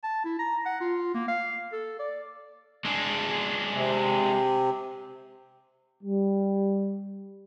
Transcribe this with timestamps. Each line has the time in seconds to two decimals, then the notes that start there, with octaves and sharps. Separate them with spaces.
0.03 A5
0.25 E4
0.39 A#5
0.66 F#5
0.81 F4
1.14 A#3
1.28 F5
1.72 A4
1.99 D5
2.85 G#3 D4
3.74 C3
6.04 G3